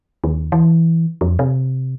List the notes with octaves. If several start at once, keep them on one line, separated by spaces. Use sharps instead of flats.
D#2
E3
F2
C3